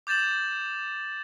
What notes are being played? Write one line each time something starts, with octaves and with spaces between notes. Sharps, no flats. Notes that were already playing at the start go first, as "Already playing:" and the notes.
D6 G6 A6 E7 F#7